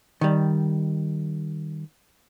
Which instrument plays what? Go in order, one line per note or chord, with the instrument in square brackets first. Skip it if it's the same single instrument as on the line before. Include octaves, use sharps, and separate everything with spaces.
[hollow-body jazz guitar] D#3 G3